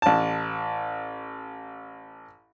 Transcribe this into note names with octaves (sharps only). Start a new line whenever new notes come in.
A1 A5